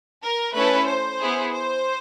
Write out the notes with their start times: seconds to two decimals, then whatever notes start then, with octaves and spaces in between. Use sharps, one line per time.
0.23 A#4
0.54 A3 C#4 E4 A4 B4
0.87 C5
1.20 B3 E4 G#4
1.52 C5